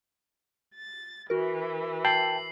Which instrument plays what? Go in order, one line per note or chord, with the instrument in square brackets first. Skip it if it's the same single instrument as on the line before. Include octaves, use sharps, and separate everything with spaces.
[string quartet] A6
[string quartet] E3 [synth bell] F#4 A#4
[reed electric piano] G5 A5 [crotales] C7 F#7